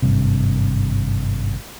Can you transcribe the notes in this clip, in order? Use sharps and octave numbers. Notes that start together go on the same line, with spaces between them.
G#1 G2 C3